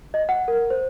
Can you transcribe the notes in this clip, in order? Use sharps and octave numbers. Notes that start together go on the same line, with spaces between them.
D#5
F#5
A#4
C5